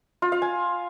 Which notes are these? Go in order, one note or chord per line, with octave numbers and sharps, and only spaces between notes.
F4
F5
G#5